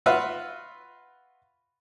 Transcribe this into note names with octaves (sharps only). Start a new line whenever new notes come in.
F4 F#4 B4 E5 F#5